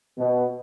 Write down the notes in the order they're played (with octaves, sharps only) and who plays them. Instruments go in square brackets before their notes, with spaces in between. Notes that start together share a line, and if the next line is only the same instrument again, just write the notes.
[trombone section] B2